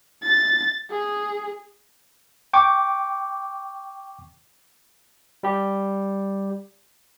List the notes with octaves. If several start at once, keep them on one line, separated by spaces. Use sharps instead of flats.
A6
G#4
G5 C#6 D6
G3 G4